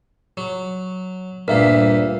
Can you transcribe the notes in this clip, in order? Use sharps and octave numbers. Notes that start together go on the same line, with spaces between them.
F#3
D2 G2 A#2 A#4 E5 F5